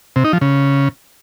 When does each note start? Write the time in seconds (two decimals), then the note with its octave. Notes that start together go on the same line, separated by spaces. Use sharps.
0.16 C3
0.24 D#4
0.33 F3
0.41 C#3